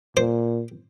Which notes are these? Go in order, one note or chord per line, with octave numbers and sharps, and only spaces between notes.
A#2 C5